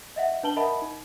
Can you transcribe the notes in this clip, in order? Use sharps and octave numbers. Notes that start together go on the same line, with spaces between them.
D#5 E5 F#5
D4 B4 A5 F#7 G7
A#4 D#5 E5 F#5 A5 B5
D#4